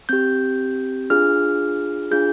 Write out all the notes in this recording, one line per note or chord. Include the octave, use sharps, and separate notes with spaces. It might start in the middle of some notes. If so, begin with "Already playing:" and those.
C4 G4 G6
D4 F4 G#4 F6
D4 F4 G#4 G6